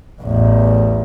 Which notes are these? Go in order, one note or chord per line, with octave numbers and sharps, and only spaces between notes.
A1 E2